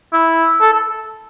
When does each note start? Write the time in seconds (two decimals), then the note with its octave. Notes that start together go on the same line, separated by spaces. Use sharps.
0.13 E4
0.61 A4
0.73 A4